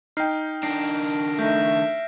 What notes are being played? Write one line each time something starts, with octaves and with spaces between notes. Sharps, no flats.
D#4 G5 F6 C7
D#3 D4 A#6 C7 D7
A3 D#4 E5 G6 A#6